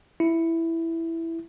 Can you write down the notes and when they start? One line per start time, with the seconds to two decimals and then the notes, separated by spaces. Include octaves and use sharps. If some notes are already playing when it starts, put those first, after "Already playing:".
0.20 E4